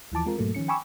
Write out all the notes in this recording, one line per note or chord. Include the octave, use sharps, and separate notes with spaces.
D#2 E3 F3 A5 D6
G#3 C4 F4 A#4
G#2 B2 F#3 A3 A#3
D#3 F3 C#4 C#7
G5 G#5 B5 C#6 D6 E6